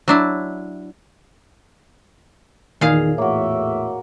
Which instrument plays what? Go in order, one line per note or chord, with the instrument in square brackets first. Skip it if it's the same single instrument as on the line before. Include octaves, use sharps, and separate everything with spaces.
[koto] F#3 D4 E4
[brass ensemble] E2 [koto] A#2 G#4 F5 [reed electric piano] D#3 D#4
[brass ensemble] E2 A2 E5 [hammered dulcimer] A#3 F#4 [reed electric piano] C#5